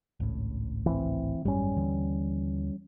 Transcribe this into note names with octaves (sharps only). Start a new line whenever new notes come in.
G#1 C#2 A2
E3 C4
G#1 F#2 G3 C#4
D#2 D3 E3